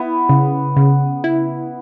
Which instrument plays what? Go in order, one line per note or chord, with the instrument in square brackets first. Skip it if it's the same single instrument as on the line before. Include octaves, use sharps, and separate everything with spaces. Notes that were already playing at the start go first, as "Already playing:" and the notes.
Already playing: [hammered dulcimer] B3 [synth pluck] E4
[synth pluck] C#3
C#3
E4